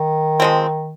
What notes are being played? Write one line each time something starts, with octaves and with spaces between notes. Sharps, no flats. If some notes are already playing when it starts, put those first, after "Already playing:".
Already playing: D#3
F3 G#3 C4